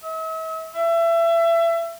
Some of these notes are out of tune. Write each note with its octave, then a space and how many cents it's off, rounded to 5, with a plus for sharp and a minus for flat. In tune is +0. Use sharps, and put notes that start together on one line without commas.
E5 -45
E5 +25